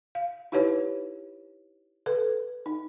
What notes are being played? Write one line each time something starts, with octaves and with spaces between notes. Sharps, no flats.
F5
D#4 E4 G4 B4 C#5
A4 B4
D#4